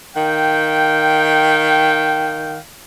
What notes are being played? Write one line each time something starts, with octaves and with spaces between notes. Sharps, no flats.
D#3 F5 G5